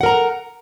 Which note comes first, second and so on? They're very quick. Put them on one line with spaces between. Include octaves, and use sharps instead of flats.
F#5 A#4 A#5